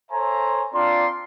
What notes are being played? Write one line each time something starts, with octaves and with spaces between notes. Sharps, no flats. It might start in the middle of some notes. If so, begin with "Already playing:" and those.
A4 C5 C#5 E5 G#5 A#5
C4 D4 F4 D5 A#5 C6